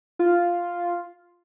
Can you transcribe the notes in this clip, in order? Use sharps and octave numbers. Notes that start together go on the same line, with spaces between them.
F4